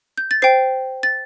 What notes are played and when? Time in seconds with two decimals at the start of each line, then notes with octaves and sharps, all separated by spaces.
0.18 G6
0.31 A6
0.42 C5 G5 C7
1.03 A6